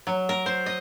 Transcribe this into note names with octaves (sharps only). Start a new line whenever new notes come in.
F#3
A#4
C5
D#5